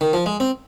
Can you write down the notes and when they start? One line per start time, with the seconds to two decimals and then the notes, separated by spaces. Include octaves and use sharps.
0.01 D#3
0.13 F3
0.26 G#3
0.40 C4